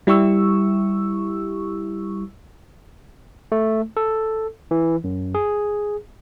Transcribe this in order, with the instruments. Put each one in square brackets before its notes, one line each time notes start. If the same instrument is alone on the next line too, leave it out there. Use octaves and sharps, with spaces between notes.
[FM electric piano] G3 E4 G4 C#6 E6
[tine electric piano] A3
A4
E3
F#2
G#4